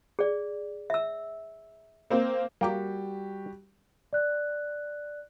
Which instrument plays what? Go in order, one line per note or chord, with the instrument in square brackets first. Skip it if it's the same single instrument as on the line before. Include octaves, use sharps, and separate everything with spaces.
[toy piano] G#4 D5
E5 E6
[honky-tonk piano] A#3 C4
[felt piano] G3 F#4 G4 [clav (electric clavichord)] A#3 D5 G5
[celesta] D5 F#6